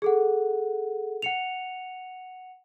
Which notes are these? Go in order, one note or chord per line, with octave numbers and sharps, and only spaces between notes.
G#4 A4 F#5
F#5 C#7 F7